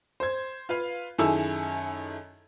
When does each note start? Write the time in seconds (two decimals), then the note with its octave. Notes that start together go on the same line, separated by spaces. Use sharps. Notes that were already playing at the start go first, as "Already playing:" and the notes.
0.20 C5 G#6
0.69 F4 B4 F5
1.18 F#2 D#3 E4 G#4 A4 E6